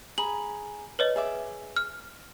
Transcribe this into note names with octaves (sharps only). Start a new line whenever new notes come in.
G#4 A#5 B5 F#7
B4 C#5 D#5
G#4 E5 D6
F6